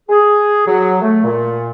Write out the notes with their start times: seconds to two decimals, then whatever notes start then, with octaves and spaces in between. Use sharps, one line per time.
0.10 G#4
0.67 F#3
1.02 A3
1.24 A#2